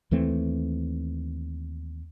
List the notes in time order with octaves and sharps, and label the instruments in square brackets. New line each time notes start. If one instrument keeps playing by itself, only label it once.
[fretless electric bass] D#2 E3 A3 C4